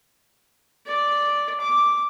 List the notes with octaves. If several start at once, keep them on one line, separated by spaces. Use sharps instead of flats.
D5
D6